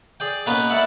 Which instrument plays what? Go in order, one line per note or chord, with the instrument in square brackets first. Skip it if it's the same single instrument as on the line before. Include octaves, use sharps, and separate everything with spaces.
[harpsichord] G#4 D5 G5
B2 A#3 B3 C#4 A#4 B4
E4 A#4 D5 E5 F#5